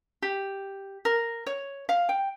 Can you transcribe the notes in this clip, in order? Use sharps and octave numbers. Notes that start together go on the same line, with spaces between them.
G4
A#4
C#5
F5
G5